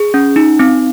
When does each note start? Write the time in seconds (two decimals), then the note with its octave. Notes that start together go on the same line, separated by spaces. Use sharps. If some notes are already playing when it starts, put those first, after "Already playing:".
Already playing: G#4
0.14 C#4
0.36 D#4
0.59 C4